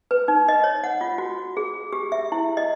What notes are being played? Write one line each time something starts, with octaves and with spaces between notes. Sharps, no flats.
B4
D#4
D#5
C#5
F#5
F4
F#4
G#4
G4
E5
E4
D#5